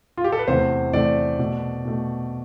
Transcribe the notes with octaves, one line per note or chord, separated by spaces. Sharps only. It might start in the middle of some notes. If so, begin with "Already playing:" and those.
F4
G4
A4
B4
E2 C3 E3 A3 C5
E2 C3 E3 A3 D5
B2 A3
B2 A3